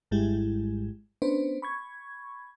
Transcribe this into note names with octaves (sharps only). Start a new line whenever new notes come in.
G#1 G#2 G3 G#3 E4 G4
B3 C#4 D4 B4 C5
B5 C#6 G#6